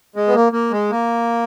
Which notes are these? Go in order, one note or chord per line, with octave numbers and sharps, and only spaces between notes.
G#3
B3
A#3
A#3
G#3
A#3